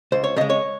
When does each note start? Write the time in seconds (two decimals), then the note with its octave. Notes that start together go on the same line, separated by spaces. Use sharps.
0.12 C#2 C5
0.24 C#5
0.36 C#3 G#3 D#5
0.50 C#5